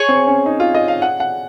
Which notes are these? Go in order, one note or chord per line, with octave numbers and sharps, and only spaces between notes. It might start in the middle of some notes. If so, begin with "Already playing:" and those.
Already playing: G#4 C#5 G#5 C#6
C4
C#4
D#4
F4
D#5
F5
F#5
F#5